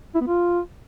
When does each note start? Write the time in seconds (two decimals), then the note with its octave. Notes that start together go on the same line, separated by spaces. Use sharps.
0.15 E4
0.21 B3
0.27 F4